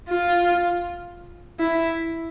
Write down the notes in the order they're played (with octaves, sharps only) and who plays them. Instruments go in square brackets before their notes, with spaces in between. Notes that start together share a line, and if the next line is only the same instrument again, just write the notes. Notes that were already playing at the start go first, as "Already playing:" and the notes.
[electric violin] F4
E4